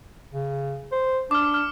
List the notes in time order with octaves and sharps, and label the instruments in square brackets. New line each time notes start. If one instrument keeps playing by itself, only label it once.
[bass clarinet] C#3
C5
[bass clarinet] D4 [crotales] D6 F6
[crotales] F6